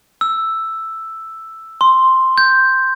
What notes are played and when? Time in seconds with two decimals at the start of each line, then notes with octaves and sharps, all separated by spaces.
0.21 E6
1.81 C6
2.38 G6